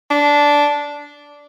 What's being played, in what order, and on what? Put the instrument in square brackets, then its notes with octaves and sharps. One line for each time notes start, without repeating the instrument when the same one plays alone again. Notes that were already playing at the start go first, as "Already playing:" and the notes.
[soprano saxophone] D4